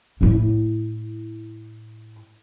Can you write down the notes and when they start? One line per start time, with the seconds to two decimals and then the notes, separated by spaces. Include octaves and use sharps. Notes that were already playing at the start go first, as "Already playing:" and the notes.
0.21 A2 E4